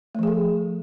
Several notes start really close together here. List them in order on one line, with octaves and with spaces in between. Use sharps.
A3 F3 G#4 A4